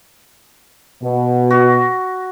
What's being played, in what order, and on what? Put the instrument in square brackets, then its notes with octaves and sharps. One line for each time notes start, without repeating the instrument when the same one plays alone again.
[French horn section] B2
[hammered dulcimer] F#4